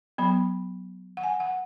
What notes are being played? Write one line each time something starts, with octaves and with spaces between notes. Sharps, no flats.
F#3 B3 B5
F#5
G#5
F#5